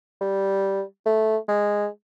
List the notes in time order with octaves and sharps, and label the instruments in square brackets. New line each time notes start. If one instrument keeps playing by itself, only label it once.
[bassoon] G3
A3
G#3